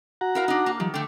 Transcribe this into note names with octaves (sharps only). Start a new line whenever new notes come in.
F#4 F#5 A#5
E4 A#4 F5
D4 D#4
A#3
D#3 F3 G3
D3 A3 G5 D6